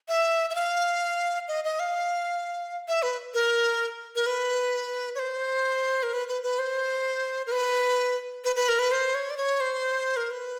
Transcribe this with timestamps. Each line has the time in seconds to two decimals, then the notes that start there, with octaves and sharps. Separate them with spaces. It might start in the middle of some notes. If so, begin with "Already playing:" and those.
0.08 E5
0.50 E5
0.55 F5
1.48 D#5
1.64 D#5
1.80 F5
2.88 E5
3.02 B4
3.34 A#4
4.16 A#4
4.26 B4
5.15 C#5
5.19 C5
6.03 A#4
6.13 B4
6.28 B4
6.43 B4
6.59 C5
7.47 A#4
7.52 B4
8.44 B4
8.56 B4
8.69 A#4
8.79 B4
8.92 C5
9.15 C#5
9.30 D5
9.37 C#5
9.60 C5
10.17 A#4
10.31 B4